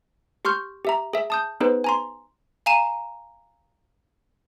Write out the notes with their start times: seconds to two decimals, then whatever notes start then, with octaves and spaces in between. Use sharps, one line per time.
0.45 G4 C6 C#6 F6 G6
0.85 G4 E5 A#5
1.13 G#4 E5
1.30 A5 D#6 G6
1.60 B3 D#4 G#4 B4 C5
1.84 G#5 A#5 C6
2.66 F5 G#5 A#5 D#7 E7